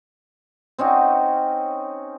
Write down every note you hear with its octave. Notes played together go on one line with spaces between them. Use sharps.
C4 C#4 D#4 F#4